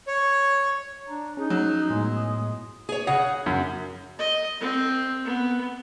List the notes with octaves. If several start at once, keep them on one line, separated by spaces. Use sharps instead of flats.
C#5
D4 A#5
C#4 D#4 G#4
F#3
A2 G#3 B3 G#5
D#6
G#4 C#5
C#3 G#4 F#5
F#2
D#5
C4
B3